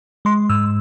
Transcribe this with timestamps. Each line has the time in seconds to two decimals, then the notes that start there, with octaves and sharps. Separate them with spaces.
0.25 G#3 C6
0.50 G#2 E6